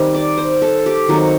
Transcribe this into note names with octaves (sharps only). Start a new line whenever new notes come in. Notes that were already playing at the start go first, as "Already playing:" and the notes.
Already playing: D#3 G3 C4
D5
C5
A4
G4
D#3 F#3 C4 F#4